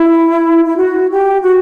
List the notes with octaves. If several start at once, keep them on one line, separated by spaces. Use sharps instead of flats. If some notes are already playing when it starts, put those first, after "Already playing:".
Already playing: E4
E4
F#4
G4
F#4